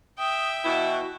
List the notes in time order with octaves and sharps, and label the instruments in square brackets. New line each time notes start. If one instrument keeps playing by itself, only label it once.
[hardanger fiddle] E5 G5 [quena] D#6
[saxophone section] B2 E3 E4 [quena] F#4